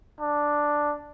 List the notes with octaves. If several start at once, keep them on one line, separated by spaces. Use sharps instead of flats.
D4